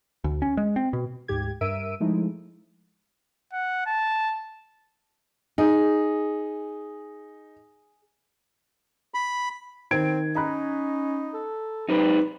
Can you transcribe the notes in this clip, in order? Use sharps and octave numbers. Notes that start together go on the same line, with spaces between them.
D2
C#4
G#3
C4
B2
D2 G#2 G4 G#6
G2 A#4 E5 E6 D7 D#7
F3 G#3 A3 D#4 E4
F#5
A5
D#4 G#4
B5
D#3 C4 G#6 D7
C#4 D#4 A#5 B5 F#6
A4
F#3 C4 D#4 G4 B4